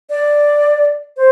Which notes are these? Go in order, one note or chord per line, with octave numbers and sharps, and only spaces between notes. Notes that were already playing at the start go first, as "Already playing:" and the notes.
D5
C5